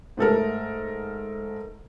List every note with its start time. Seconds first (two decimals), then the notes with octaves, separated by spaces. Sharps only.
0.17 G#2 A3 A4 A#4